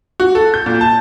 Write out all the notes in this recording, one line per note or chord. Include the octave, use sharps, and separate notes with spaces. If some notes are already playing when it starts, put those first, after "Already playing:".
F#4
A4
G6
A#2
A5